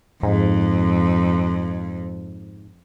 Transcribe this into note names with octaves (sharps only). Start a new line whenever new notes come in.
F2 G#2